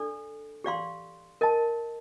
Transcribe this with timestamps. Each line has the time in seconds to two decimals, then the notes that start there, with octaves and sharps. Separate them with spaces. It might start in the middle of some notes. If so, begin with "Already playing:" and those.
Already playing: D4 A4 D5
0.64 G4 D5 F5 C6
1.41 A#4 D#5 A5